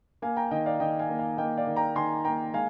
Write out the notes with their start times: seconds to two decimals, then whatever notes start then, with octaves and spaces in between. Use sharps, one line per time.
0.22 A#3 F5 G#5
0.37 G5 A#5
0.51 D#3 D#5 G5
0.66 D5 F5
0.80 D#3 D#5 G5
0.99 F5 G#5
1.09 A#3
1.19 F5 G#5
1.38 A#3 D#5 G5
1.57 D5 F5
1.67 D#3
1.76 G5 A#5
1.96 D#3 G#5 C6
2.25 A#3 G5 A#5
2.53 G#3 F5 G#5